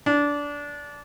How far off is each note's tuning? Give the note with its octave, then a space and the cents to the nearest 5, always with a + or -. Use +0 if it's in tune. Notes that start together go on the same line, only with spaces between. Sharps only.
D4 -20